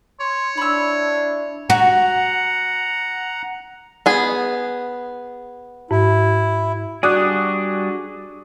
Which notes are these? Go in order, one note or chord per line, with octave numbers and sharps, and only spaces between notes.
C#5 C6
D4 E4 B5 E6
F#4 F#5 A#5
B3 G#4
G#2 E4
G3 D4 F#4 G#4 D5 D6 D#6 F#6